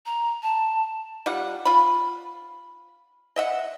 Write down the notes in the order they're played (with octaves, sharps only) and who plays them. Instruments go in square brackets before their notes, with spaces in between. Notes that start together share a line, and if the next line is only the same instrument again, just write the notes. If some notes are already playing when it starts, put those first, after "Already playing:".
[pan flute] A#5
A5
[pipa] G3 F4 F#5
F4 B5
D#5 E5 F#5